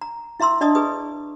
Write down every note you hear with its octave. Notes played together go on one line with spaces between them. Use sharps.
A#5
E4 E5 A#5 C6 E6
D4 D5 D#5 A5 D#6
G#4 B4 D#6